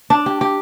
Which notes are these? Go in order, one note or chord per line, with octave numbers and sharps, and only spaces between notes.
D4
G4
G4